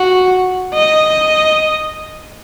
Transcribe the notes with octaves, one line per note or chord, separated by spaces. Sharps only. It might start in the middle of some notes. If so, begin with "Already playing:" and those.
Already playing: F#4
D#5